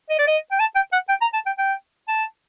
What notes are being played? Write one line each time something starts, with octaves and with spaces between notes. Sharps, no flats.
D#5
D5
D#5
G5
A5
G5
F#5
G5
A#5
A5
G5
G5
A5